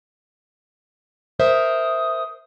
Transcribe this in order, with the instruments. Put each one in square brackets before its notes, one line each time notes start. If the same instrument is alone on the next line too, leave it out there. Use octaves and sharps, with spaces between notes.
[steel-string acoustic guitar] A#4 C5 E5 [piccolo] D#6